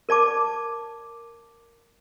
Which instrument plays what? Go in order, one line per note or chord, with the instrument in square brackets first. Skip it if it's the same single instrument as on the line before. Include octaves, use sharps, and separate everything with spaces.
[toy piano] A#4 D5 A5 D6